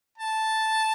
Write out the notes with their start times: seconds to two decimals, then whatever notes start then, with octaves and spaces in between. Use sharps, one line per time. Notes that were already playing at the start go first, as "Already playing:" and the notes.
0.18 A5